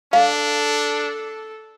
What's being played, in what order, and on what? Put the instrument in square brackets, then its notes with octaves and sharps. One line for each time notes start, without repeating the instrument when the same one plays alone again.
[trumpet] D4 [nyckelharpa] A4 [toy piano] F5